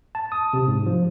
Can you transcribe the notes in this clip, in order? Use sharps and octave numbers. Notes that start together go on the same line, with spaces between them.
A5
D#6
C3
G#2
F3